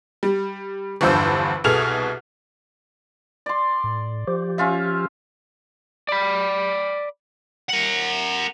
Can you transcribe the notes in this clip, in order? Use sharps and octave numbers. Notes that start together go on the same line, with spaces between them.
G3
G1 E2 G2 F3 C5 E6
C2 B2 G#4 A4 F6 F7
D5 C6
A2
F3 G4
C#4 F4 E5
D5 B5
A#4 F#5